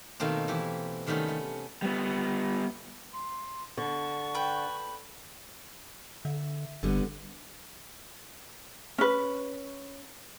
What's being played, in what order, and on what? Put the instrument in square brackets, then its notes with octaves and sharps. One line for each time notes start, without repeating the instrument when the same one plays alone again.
[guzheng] B2 D#3 A3 A#3 C4
E3 E4 G4
C3 D#3 G3 A3 B3 C#4
A3
[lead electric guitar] G3 B3
[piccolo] C6
[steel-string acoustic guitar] D3 [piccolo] A5 [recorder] C#6
[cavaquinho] B4 G5
[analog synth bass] D3 [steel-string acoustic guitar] E5
[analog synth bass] G1 [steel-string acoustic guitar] D3 G3 B3
[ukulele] C#4 B4